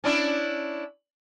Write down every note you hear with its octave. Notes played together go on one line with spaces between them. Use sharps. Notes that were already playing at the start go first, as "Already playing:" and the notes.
C#4 D4 E4